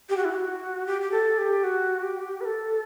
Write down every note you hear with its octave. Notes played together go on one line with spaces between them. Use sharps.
G4
F#4
E4
G4
F#4
G4
G4
A4
G4
F#4
G4
B4
A4